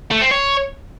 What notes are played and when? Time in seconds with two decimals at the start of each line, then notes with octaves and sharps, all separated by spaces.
0.11 A3
0.21 C4
0.32 C#5